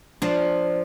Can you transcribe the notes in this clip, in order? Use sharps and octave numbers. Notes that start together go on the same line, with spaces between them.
F3 D4